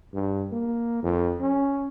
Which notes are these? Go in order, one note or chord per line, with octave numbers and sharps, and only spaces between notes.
G2
A#3
F2
C#4